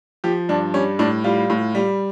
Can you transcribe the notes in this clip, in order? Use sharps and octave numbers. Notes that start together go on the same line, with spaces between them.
F3 G4
G2 D4
G3 C#4
A2 D4
G3 F4
A2
G3